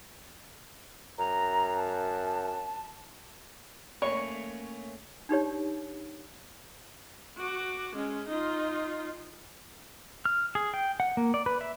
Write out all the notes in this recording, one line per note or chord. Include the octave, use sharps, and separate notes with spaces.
F#2 A#5
A5
A3 A#3 C#4 C#5 C#6
D4 D#4 G4 C#5
F#4 D6
G#3 C#4
D#4 F4
F6
G#4
G5
F#5
A#3
D5
B4
E5